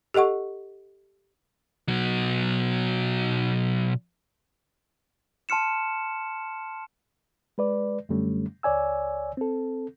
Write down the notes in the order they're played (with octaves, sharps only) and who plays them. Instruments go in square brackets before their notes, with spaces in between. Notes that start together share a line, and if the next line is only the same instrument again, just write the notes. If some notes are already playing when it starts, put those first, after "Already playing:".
[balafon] G4 A4 D#5 F#5 C#6
[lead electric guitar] B2 F#3
[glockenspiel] A5 C6 F6 C#7 E7
[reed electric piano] G#3 B4 D5
F#2 D3 F#3 G3 A3 C#4
C#2 C#5 D5 G#5 E6
C4 A4